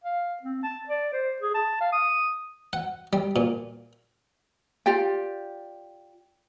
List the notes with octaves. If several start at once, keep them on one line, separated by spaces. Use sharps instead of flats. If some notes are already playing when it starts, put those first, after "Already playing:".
F5
C4
A5
D5
C5
G#4
A5
F5
D#6
F#5
G3
A#2
F4 G4 D5 G5